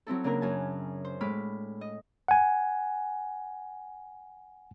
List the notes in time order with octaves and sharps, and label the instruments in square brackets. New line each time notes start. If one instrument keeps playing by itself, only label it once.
[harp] F#3 C4 E4 A4
C#3 A#3 D4 A#4
F#2 G#5 A5
C5
A2 G#3 B5 D6 F6
D#5
[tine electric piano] F#5 G#5